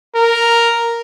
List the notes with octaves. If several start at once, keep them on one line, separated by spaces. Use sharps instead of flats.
A#4